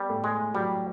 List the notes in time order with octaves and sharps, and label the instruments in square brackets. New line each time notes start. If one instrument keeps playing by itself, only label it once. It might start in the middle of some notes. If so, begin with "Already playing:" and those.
Already playing: [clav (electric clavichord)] G3 [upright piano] B3
[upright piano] A2
[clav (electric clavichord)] G#3
[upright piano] F#3 [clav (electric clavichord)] G3